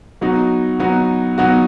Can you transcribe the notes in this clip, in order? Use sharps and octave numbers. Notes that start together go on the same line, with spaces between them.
F#3 B3 D#4 F#4
F#3 B3 D#4 F#4
F#3 B3 D#4 F#4